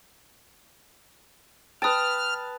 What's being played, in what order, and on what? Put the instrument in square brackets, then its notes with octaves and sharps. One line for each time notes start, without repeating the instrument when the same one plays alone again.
[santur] B4 A5 [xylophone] G5 D#6 [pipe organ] F6